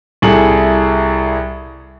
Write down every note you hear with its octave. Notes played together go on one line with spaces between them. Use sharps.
C2 E4 G#4 A4 F#7